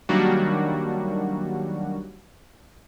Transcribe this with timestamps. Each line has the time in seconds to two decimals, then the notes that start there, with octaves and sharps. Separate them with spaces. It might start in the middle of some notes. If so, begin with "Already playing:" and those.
0.09 D#3 F#3 G3 A#3 D4 F#4